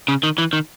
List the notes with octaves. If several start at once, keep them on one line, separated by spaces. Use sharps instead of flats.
C#3
D#3
E3
D#3